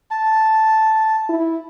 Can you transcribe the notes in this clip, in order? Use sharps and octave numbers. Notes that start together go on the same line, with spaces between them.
A5
E4